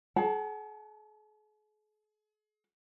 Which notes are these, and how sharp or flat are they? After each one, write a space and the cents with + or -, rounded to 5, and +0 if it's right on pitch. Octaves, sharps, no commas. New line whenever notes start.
G#4 +45 F#5 +40 A5 +15